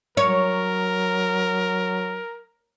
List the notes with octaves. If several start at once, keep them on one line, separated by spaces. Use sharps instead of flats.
F#3 A#4 C#5